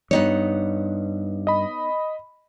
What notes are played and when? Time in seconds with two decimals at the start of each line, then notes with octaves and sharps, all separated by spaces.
0.11 G2 B3 D#4 C#5
1.47 D#5 B5